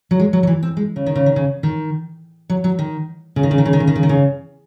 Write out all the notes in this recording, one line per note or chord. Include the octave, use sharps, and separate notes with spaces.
F#3
G#3
F#3
F#3
E3
C4
G#3
C#3
D#3
C#3
D#3
C#3
D#3
F#3
F#3
D#3
C#3
D#3
C#3
D#3
C#3
D#3
C#3
D#3
C#3
D#3
C#3